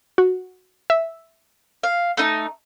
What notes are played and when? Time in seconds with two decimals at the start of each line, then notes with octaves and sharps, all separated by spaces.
0.18 F#4
0.90 E5
1.83 F5
2.17 A3 D#4